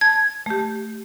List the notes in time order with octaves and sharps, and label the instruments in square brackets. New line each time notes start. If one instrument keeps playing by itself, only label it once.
[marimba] A5 [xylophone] G#6
[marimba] A3 G4